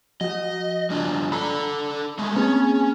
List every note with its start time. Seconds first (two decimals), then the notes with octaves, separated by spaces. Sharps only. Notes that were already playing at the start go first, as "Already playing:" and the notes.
0.21 F3 F#4 D#5
0.90 G3 D4 F4
1.32 D4 A4 A#5 B5
2.19 G#3 A3
2.35 A#3 C4 C#4 G#4